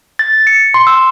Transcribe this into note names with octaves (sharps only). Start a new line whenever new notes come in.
A6
C#7
C6
E6